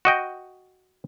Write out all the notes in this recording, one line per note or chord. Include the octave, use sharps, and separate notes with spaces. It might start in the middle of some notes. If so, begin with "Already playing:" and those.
F#4 D#5 G5